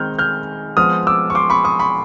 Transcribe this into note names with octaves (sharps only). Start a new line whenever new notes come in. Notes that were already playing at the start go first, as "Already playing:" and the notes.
Already playing: D#3 G#3 C4 D#4 F6 G6
F6 G6
F3 G#3 B3 D#6 F6
D6 E6
C#6
C6 D6
B5 C#6
C#6 D#6
B5 C#6